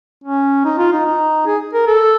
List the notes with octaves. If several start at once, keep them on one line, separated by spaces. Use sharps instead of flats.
C#4
D#4
F4
D#4
D#4
G#4
A#4
A4